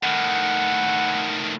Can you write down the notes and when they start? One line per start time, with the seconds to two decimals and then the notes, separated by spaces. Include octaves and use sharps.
0.03 A2 D#3 F#5